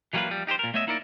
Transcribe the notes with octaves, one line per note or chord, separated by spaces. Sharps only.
E3 F#3 G3 A#3 F4 B4
F3 G3
D#4 G4 A#4 C5
A#2 A#4
A3 B3 C#5 D#5 E5
A#3 D#4 E4 A#4 B4 D5